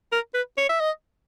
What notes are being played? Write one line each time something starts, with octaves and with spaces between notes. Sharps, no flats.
A#4
B4
C#5
E5
D#5